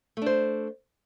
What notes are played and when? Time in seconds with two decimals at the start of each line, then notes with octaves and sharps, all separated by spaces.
0.17 A3
0.22 D4
0.26 C5